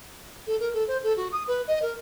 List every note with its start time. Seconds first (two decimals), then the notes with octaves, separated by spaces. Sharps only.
0.47 A4
0.60 A#4
0.73 A4
0.87 C5
1.03 A4
1.16 F#4
1.32 D#6
1.47 B4
1.67 D#5
1.82 A#4